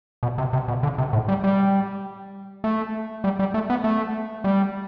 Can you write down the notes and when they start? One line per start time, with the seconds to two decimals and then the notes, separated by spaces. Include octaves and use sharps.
0.23 B2
0.38 C3
0.53 C3
0.68 B2
0.83 D3
0.98 C3
1.13 A2
1.28 G3
1.44 G3
2.64 A3
3.24 G3
3.39 G3
3.54 A3
3.70 B3
3.84 A3
4.44 G3